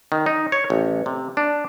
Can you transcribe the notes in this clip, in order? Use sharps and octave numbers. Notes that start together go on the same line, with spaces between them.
D#3
D#4
C#5
A1
C3
D4